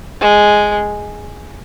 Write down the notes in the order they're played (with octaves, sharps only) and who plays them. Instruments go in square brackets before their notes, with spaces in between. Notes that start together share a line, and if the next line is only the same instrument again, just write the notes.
[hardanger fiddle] G#3